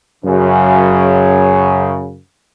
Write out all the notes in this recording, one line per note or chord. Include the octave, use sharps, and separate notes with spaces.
F#2 C#3